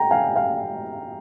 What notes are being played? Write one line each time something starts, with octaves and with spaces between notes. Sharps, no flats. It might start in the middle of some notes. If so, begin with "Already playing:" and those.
Already playing: G5 A#5
F5 G#5
F5